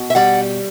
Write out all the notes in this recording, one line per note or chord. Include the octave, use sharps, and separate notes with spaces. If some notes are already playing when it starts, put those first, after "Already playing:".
Already playing: B2
E5
G3 D5 F#5